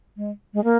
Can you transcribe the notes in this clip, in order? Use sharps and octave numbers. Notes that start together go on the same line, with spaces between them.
G#3
G#3
A#3